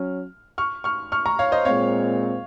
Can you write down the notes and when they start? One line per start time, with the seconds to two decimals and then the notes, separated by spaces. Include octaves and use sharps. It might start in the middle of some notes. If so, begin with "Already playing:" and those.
Already playing: F#3 C#4 F6
0.58 C#6 F6
0.84 C#6 F6
1.12 C#6 F6
1.26 A#5 C#6
1.39 C#5 F5
1.52 C5 D#5
1.65 A#2 G#3 C4 C#5 F5